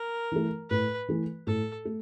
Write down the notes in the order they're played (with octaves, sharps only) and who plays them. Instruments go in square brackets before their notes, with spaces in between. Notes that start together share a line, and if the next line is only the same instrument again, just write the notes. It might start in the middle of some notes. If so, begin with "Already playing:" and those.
Already playing: [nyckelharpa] A#4
[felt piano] E3 A3
[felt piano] A2 [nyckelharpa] B4
[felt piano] E3 A3
[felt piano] A2 [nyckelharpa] A4
[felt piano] A3